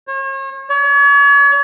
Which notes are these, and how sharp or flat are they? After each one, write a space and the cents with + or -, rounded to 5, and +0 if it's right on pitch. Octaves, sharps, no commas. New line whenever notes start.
C#5 -40
C#5 +40